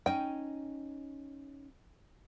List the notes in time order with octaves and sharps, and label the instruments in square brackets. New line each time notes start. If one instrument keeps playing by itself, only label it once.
[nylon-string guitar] C#4 D#4 [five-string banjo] G5